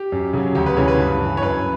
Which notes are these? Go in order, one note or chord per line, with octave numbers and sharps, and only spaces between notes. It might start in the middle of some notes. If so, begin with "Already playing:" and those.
Already playing: G4
F#2
C#3 F#3
D2 G4
B4
C#3 E3 C#5
B4
G2
E3
C#5
F#2 B4